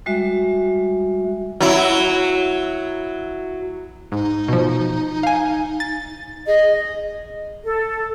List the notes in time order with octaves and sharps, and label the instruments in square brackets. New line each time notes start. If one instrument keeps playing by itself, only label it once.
[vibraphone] G3 G#3 F#4 E5
[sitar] F#3 E4
[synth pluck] G#2 [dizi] D#4
[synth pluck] B2 F3
F5 G#5
A6
[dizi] G#4 [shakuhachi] D#5
[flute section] A4